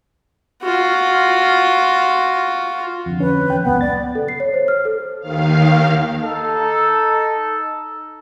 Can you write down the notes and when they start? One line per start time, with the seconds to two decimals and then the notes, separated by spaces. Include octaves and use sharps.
0.62 F4 F#4
3.06 F2 D3
3.20 C#4 B4
3.50 E2 G5
3.64 C#2 F#2 A#2 B3
3.81 D5 A6
4.15 A4
4.28 C7
4.40 C#5
4.54 C5
4.68 F6
4.85 A4
5.20 D#2 D#3 F5
6.23 D#4 A4